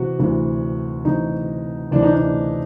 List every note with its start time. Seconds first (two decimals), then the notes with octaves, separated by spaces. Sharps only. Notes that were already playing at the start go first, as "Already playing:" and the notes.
Already playing: C3 E3 F#4
0.19 D2 C3 E3
1.05 D2 C3 E3 D#4
1.91 D2 C3 E3 D4
2.03 D#4
2.13 D4